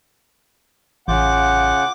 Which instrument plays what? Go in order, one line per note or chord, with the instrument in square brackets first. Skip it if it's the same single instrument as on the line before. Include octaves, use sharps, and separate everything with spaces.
[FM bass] A1 [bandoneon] C#3 F4 G6 [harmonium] F#5 [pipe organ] D6